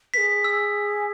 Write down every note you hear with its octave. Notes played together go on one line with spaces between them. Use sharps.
G#4 B4 B6
E6